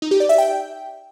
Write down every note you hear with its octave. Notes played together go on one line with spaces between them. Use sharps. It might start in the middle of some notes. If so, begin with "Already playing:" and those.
D#4
G4
D5
E5
G5